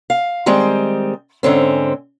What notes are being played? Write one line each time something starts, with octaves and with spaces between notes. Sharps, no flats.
F5
D#3 G3 G#3 C4
G#2 D3 C4 C#4